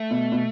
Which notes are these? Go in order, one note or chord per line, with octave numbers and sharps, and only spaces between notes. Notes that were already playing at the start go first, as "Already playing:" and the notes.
Already playing: A3
B2
B2